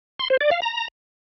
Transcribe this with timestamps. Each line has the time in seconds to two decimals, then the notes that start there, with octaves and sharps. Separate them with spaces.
0.19 C6
0.30 C5
0.41 D5
0.51 F5
0.62 A#5